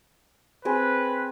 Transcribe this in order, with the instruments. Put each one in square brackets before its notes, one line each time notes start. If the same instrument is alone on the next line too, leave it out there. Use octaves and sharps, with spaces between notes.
[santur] C4 G#4 [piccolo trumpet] B4